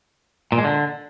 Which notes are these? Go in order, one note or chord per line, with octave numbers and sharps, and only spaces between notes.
A#2
G#3
D3